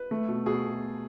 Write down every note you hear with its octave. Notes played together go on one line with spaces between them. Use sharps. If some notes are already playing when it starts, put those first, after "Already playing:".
Already playing: B4
A3
B2
B2 G#4